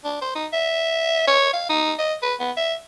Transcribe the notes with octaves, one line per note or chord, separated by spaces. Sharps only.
D4
C5
D#4
E5
C#5
F5
D#4
D#5
B4
B3
E5